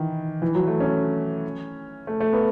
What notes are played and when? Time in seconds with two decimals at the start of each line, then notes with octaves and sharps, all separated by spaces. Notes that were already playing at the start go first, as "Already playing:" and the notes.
Already playing: D#3 E3
0.42 E3
0.55 F#3
0.67 A3
0.80 C#4
2.07 A3
2.20 A3
2.33 B3